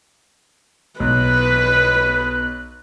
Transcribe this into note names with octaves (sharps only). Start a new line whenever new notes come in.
B1 B4 F#6